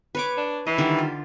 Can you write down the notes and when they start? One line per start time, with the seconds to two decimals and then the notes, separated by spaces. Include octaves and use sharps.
0.15 B4 C#5 D6
0.37 D4
0.67 E3 D#5
0.78 D3 D#3 G3
0.98 F4